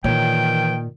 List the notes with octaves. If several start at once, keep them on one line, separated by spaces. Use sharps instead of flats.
A#2 D#3 E3 C#5 G5